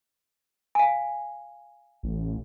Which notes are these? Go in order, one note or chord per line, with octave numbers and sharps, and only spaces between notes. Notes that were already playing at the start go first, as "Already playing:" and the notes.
F5 G#5
A1